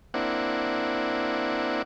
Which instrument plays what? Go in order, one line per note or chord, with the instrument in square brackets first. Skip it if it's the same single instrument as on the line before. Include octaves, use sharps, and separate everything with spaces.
[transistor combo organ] A#3 C4 D4 E4 F#5